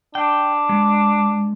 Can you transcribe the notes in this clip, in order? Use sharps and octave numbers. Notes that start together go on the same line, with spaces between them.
D4 G5
G#3